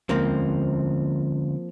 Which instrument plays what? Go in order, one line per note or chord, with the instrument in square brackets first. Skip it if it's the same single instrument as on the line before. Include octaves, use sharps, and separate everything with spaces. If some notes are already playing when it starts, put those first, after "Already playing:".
[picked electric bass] D3 G#3 C#4 [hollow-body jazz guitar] F3 A#3 C4